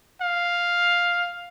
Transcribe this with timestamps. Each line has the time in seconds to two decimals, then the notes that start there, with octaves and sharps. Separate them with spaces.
0.21 F5